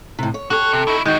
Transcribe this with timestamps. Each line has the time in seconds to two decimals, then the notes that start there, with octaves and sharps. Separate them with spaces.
0.19 A2 C3
0.34 C#5
0.50 F#4 G4 A4 C#5 F#6
0.73 C3
0.88 D#4 E4 C#6
1.06 D#3 G#3 F#4 G6